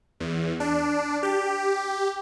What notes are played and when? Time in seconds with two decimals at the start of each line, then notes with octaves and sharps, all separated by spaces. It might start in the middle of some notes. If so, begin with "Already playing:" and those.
0.20 E2
0.60 D4
1.23 G4